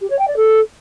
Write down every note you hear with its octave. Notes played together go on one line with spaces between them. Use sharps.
G4
C#5
G5
D5
A4